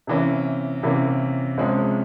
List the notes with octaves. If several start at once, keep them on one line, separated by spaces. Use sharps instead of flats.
C3 E3 A#3 C#4
C3 E3 A#3 C#4
C#2 C3 F3 G#3 C#4